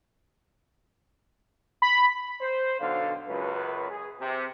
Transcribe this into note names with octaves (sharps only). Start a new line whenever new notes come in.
B5
C5
B1 D3 F5
C#2 F#2 B4
G#4
C3